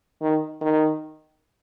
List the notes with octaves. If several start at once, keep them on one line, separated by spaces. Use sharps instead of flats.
D#3
D#3